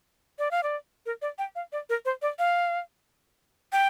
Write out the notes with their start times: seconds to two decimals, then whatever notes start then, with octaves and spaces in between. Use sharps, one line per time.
0.39 D5
0.51 F5
0.63 D5
1.06 A#4
1.22 D5
1.38 G5
1.55 F5
1.72 D5
1.90 A#4
2.05 C5
2.22 D5
2.39 F5
3.73 G5